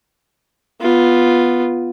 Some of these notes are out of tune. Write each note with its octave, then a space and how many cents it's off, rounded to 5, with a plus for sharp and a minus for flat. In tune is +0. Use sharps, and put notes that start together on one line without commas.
B3 +0 F4 +0